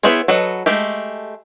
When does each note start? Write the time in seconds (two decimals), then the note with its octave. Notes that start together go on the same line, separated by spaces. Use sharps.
0.03 B3 E4 G#4 C5 C#5
0.28 F#3 A4 B4 D#5
0.66 G#3 A3 G4